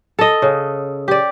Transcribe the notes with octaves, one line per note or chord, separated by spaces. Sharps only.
A4 D#5
C#3
G4 D5